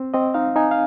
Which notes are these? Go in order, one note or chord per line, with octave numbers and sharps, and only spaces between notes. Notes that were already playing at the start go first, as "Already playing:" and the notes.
Already playing: C4
C4 D#5
D#4 F5
D#4 G#5
F5